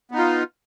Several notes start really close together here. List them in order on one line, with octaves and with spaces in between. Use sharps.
B3 D#4 F4